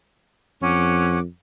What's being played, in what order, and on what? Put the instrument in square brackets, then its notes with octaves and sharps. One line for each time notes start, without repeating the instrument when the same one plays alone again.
[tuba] F2 [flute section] C#4 F#5 D6